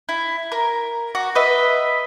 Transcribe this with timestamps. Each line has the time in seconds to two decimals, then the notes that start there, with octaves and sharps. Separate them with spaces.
0.09 E4
0.52 A#4
1.15 F#4
1.35 B4 D#5 E5